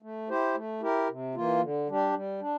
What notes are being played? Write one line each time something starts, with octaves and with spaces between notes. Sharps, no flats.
A3
E4 G4 C5
A3
E4 G4 A#4
C3
E3 A#3 F4
D3
G3 D4 G4
G3
D4